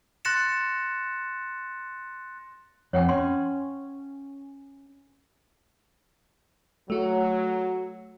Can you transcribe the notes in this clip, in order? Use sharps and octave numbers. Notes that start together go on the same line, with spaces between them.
C6 F#6 A6 A#6 C#7 E7
F2 C#5 F#5 G5
C#4 C6
F#3 A3 F#4